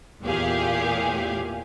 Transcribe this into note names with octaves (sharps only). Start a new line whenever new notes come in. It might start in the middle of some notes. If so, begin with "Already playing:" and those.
E2 A#2 G4 G#4 F5